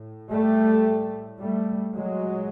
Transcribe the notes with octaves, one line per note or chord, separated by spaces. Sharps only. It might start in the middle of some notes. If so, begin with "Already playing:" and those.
Already playing: A2
G3 A3
A2
G3 A3
A#2 F#3 G#3